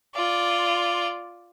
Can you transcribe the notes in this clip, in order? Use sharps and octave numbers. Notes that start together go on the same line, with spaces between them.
F4 D5